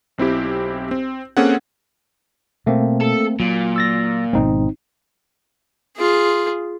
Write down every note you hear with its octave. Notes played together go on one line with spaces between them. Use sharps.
B1 C4 E4 G4
C4
A#3 C4 C#4 G#4 A4 F#5
B2 A3 A#3 C4
A4
A#2 F#3
E6 A6 A#6
G#1 B2 G#3 C4 D#4
F4 G#4